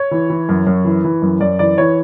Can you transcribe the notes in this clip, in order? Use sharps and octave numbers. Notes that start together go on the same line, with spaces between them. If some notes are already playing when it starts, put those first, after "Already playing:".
Already playing: C#5
E3
E3
F#2
F#2
E3
E3
F#2
F#2 D5
E3 D5
E3 C#5